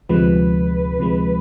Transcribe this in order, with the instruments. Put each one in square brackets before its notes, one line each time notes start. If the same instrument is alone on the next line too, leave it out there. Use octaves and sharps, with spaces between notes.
[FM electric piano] D2 C3 F3 G#3 [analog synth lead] B4
[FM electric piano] D2 C3 F3 G#3